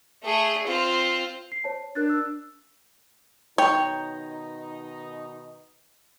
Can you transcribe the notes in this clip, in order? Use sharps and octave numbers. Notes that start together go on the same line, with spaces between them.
A3 G#4
C4 F4
C7
C5 C#5 A5
D4 A#4 F#6 A6
E6
B2 D#3 D#4 C#5 G5